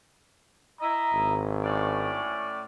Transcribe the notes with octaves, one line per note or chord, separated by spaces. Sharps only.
E4 D#5 A#5
G#1
A2 C#4 D5